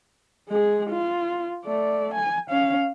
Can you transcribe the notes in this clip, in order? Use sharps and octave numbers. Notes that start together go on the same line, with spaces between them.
G#3 G#4
F4
A3 D5
G#5
C#4 F5